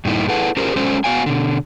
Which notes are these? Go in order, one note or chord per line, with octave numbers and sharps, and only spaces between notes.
G2 A#2 D#3 D#4 E4
E4 G#4 A4 B4 F#5
C#4 F4 G4 G#4 A#4 C5
F#3 G#3 C#4 A4 C5
B3 F#4 F5 G#5
B2 D3